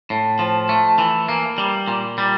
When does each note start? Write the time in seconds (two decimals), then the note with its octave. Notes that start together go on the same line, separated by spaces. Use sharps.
0.10 A2
0.39 F3
0.69 A3
0.98 E3
1.29 A#3
1.58 G3
1.88 A#2
2.18 G3